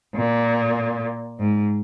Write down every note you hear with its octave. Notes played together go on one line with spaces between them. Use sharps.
A#2
G#2